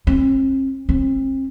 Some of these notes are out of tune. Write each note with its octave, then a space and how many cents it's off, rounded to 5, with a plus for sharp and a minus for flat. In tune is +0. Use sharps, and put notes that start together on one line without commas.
C4 +40
C4 +40